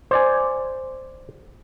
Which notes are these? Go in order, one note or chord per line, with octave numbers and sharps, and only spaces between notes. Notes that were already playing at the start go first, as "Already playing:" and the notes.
C5 D5 G#5